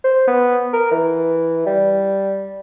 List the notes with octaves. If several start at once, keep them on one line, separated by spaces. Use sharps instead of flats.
C5
B3
A#4
E3
G3